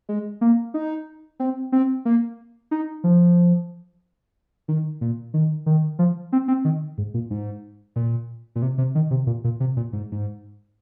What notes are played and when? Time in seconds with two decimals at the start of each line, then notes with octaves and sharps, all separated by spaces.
0.09 G#3
0.41 A#3
0.74 D#4
1.40 C4
1.72 C4
2.05 A#3
2.71 D#4
3.04 F3
4.68 D#3
5.01 A#2
5.34 D#3
5.66 D#3
5.99 F3
6.32 C4
6.48 C4
6.65 D#3
6.98 G#2
7.14 A#2
7.30 G#2
7.96 A#2
8.56 A#2
8.62 C3
8.78 C3
8.95 D#3
9.11 C3
9.27 A#2
9.44 A#2
9.60 C3
9.77 A#2
9.93 G#2
10.12 G#2